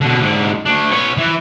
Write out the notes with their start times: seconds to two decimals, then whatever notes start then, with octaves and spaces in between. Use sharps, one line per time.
0.01 B2 D3
0.20 G#2 D3
0.65 A3 D4
0.91 B3 C#5
1.17 E3